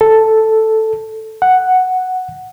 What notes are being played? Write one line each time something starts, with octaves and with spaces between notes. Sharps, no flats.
A4
F#5